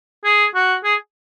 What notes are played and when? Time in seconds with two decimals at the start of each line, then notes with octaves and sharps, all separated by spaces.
0.24 G#4
0.55 F#4
0.84 G#4